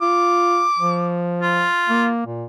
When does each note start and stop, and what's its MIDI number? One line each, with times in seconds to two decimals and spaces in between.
0.02 0.65 65
0.02 1.19 86
0.79 1.66 53
1.42 2.07 65
1.89 2.25 58
2.26 2.45 46